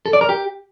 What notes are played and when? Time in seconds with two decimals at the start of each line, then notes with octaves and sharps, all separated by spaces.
0.06 A4
0.13 D5
0.21 A#4
0.29 G4